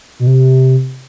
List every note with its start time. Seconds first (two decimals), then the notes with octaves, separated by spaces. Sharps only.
0.20 B2
0.27 C3